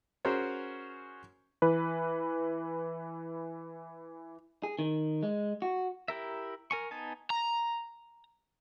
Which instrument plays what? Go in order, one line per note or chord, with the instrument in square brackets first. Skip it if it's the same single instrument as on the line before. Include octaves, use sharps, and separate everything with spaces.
[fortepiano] C#4 F#4 G#4 A#4 C5 C#5
[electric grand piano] E3 B4
[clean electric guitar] G#4
D#3
G#3
F#4
[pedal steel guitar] E4 G4 A#4 E5
A#4 G#5 C#6
B3 D#4 G#5 A5
[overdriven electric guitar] A#5